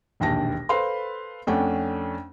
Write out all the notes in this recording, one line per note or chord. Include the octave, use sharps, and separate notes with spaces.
E1 A#1 D#2 G5 A5 A#6
A4 B4 C5 F5 B5 C6
F2 A3 C#4 D4 F#5 G5